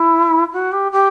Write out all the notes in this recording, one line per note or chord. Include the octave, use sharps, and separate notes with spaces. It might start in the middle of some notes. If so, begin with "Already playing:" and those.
Already playing: E4
F#4
G4
G4